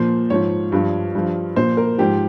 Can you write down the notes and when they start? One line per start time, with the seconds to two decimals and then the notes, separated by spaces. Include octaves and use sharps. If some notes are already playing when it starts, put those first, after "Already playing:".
Already playing: A#2 F3 C5
0.30 G#2 F3 C#5
0.72 G2 F3
1.15 G2 F3
1.56 A#2 F3 C5
1.77 A#4
1.98 G#2 F3 G4